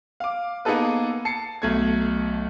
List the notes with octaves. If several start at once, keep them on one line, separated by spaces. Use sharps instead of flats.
F5 D6
A#3 B3 D#4 G#4 A4 B4
A5 C7 C#7
B1 A3 G#6